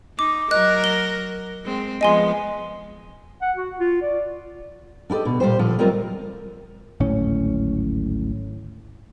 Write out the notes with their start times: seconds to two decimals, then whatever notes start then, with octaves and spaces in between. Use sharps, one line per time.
0.19 D#4 D6
0.51 F#3 A#4 D#5 F#6
0.84 G7
1.64 G#3 C4
2.01 F3 G#3 B3 D#5 G#5 C6
3.41 F#5
3.56 F#4
3.80 F4
4.02 D5
5.10 D4 E4 G4 A4 D#5
5.25 D2 B2
5.40 A#2 G3 G4 C5
5.59 A#2 D3 F3
5.79 F#3 G3 C4 F4 A#4 D#5
7.00 D1 G#1 A2 C#4